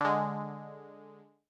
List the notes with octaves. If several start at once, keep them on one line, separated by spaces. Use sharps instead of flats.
D3 G#3